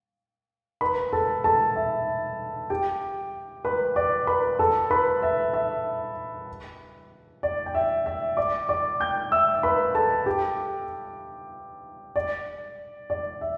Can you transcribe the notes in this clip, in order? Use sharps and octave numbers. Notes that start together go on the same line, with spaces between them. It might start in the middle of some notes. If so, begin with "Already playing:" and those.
B4 B5
A4 A5
A4 A5
E5
G4 G5
B4 B5
D5 D6
B4 B5
A4 A5
B4 B5
E5
E5
D5
G5
E5
E5
D5 D6
D5 D6
G5 G6
E5 E6
B4 B5
A4 A5
G4 G5
D5
D5
E5